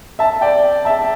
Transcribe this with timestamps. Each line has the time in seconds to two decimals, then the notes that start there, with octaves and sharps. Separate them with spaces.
0.19 E5 A5
0.41 D5 G5
0.85 E5 A5